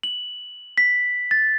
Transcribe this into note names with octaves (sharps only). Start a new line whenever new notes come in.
F#7
B6
A6